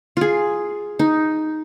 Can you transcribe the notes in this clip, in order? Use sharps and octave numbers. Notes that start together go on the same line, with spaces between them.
F4 G#4
D#4